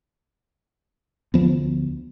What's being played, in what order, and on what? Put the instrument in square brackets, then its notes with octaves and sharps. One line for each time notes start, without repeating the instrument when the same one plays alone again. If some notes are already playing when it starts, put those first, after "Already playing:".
[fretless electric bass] D2 F3 B3